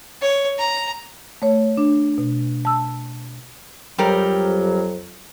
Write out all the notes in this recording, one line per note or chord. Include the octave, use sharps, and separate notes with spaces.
C#5
A#5
A3 C#5
D4
B2
A5 E6
F2 F#3 G3 G4 A#4